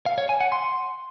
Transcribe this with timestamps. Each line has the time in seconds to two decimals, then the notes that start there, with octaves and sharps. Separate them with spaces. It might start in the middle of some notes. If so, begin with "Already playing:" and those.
0.06 F5
0.18 C#5
0.29 G#5
0.41 F#5
0.52 C6